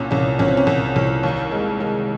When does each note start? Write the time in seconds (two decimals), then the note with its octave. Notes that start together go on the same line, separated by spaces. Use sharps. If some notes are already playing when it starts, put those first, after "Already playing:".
Already playing: C2 A#2 C#4
0.11 C2 C#4
0.39 C2 C#4
0.48 C4
0.57 C#4
0.67 C2
0.96 C2
1.23 D#2
1.51 G#3
1.80 G#3